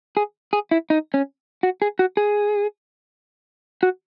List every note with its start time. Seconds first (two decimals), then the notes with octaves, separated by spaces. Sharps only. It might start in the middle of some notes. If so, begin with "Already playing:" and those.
0.17 G#4
0.53 G#4
0.71 E4
0.90 D#4
1.14 C#4
1.63 F#4
1.82 G#4
1.99 F#4
2.17 G#4
3.83 F#4